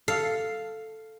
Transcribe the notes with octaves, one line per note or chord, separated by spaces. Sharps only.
A4 F5